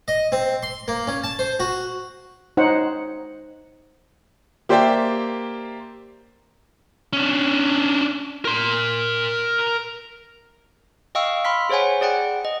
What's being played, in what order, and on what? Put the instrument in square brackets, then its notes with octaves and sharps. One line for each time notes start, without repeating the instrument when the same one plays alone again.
[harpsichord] D#5
C4
C6
A#3
C#4
A5
C5
F#4
[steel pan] D#4 C5 C#5 F#5
[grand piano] A#3 G4 C5 D5 E5 G5
[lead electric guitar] C#4 D4
A#4 C6
[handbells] D#5 F5 G5 C#6 E6
B5 C6 F6 B6
G#4 C5 C#5 F#5 G#5
G#4 D5 F#5 G5
D#5